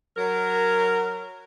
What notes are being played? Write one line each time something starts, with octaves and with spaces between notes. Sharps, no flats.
F#3 A#4